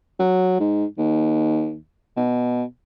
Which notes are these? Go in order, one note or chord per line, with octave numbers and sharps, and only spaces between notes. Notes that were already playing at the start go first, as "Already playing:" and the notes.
F#3
G#2
D#2
B2